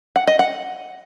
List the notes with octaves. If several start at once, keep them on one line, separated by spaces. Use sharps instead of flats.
F#5
D#5
F#5